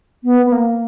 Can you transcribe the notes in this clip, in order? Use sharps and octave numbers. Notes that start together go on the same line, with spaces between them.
B3
B3
A#3